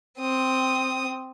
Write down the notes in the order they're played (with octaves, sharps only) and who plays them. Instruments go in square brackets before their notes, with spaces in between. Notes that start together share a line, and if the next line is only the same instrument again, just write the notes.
[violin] C4 D#6